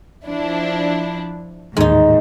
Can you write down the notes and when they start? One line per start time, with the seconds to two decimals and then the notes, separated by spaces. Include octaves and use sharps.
0.25 F3 D4 E4
1.77 A1 D#2 G#2 D#4